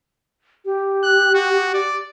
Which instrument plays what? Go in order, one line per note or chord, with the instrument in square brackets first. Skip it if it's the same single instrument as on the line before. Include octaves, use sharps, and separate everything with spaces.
[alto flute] G4
[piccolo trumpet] F#6
F#4
D5